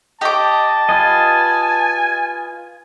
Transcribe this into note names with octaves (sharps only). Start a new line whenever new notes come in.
G4 D#5 A5 D6
F4 B4 D#5 G#5